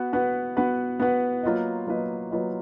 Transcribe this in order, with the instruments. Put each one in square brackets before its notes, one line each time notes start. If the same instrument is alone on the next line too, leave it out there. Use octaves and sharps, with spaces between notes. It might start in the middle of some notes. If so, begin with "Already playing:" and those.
Already playing: [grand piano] B3 F#4 B4
B3 F#4 B4
B3 F#4 B4
B3 F#4 B4
F#3 A#3 F4 B4 D#5
F#3 A#3 F4 B4 D#5
F#3 A#3 F4 B4 D#5